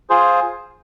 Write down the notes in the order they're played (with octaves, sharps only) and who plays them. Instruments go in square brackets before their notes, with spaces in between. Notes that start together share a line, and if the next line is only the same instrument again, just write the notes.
[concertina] F4 G#4 C5